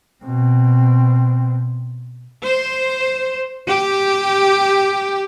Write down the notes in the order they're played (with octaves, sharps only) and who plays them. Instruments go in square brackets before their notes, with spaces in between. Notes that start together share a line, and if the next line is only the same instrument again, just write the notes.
[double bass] B2 C4
[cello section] C5
G4